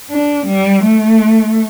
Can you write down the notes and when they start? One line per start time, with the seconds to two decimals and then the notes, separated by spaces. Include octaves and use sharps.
0.10 D4
0.46 G3
0.83 A3